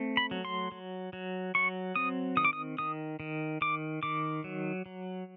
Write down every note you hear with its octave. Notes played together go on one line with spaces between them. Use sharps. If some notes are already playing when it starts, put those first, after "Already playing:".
Already playing: A3 C4
B5
F#3
C6
F#3
F#3
F#3 C#6
C4 D#6
D#3 D#6
D6
D#6
D#3 D#6
D#3
D#3 D6
D#3 D6
F#3
F#3